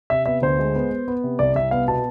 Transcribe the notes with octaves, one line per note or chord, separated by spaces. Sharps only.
C3 E5
B3 E5
D2 C5
G#3
B3
B3
B3
C3
C2 D5
C2 E5
B3 F5
B2 A5